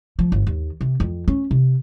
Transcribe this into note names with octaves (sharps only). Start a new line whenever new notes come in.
F3
G1
D#2
C3
F2
C#4
C3